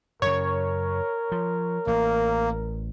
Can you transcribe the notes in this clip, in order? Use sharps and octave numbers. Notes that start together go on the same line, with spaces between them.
F#2 C#3 A#4 C#5
F3
A1 A#3